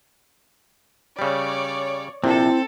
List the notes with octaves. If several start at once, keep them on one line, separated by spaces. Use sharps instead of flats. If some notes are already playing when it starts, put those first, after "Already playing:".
C#3 G3 C#5 D5
A#1 C3 C4 E4 A4